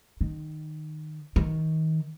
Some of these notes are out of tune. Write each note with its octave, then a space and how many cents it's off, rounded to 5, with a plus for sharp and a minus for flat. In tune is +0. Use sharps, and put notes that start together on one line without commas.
D#3 -15
D#3 +30